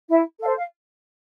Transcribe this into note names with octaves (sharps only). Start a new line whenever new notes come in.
E4 E5
A4 C5 F5
F5